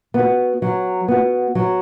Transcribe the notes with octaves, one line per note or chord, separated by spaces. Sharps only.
B3 F#4
F#3
B3 F#4
F#3